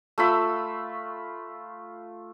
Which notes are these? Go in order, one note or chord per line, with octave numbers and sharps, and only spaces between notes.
A3 F4 B5 E6